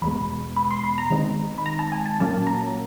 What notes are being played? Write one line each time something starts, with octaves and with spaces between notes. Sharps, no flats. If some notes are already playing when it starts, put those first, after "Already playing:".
E2 B2 G#3 B5
B5
C6
B5
A#5
D#3 G#3 C4 D#4
B5
A#5
A5
G#5
A5
A#2 F#3 A#3 C#4 A5
A#5